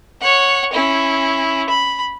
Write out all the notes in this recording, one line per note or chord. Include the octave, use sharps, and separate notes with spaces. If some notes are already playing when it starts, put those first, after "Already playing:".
C#5 F#5
C#4 E4
B5